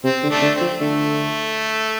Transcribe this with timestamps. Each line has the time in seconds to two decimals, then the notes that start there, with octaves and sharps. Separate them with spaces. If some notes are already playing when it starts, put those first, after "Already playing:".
0.04 C3 C4
0.23 D3
0.30 A3 D4
0.42 D3
0.55 C4
0.61 F3
0.80 D3 A3